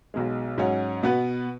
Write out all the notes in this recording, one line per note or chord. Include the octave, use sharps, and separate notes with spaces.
B1 B2 G#3
G#2 F#3 C#4 F#4
B2 B3 F#4 B4